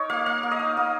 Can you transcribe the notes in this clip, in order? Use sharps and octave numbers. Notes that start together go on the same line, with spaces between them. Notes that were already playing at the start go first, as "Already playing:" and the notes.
Already playing: D#4 A#4 C#5
A#3 F5
A#3 F5
A#3
D#5
D#4
A#3